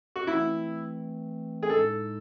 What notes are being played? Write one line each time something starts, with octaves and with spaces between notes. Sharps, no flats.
F#4
E3 A3 C4 E4
G#4
A2 G#3 D#4 A4